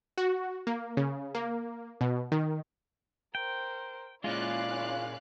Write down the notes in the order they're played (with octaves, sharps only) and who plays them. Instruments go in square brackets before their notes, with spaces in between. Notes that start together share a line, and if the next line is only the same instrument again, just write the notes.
[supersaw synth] F#4
A#3
C#3
A#3
B2
D#3
[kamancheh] A#4 C5 [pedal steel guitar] G5
[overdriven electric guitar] A#2 G#3 [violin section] C#4 F5 F#6 [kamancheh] E4 D5 [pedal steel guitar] F4